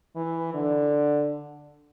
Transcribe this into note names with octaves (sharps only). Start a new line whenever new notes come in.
E3
D3